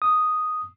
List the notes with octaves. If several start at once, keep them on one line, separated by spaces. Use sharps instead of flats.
D#6